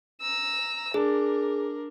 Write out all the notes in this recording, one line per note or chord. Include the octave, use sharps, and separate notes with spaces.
A#5 E6
D4 G#4 A#4